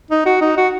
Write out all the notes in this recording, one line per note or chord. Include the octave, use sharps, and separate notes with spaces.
D#4
F#4
D#4
F#4